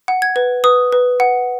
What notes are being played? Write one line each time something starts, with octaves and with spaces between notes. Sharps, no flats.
F#5
G#6
B4
B4 D#6
B4
F#5